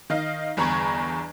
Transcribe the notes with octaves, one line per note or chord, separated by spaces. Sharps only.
D#3 D#5 F5
G1 E2 A#5 B5 C#6 G#6